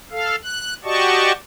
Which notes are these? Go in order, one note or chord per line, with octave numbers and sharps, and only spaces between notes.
A4 F5
F#6
F#4 G4 D5 D#5 A5 C#6